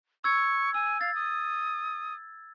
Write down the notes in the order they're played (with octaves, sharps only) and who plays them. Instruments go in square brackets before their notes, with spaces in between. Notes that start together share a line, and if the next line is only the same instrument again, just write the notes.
[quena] C#6 [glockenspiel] E6 G#6
[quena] G#5 [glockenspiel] E6
[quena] F5 [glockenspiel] A6
[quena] D#6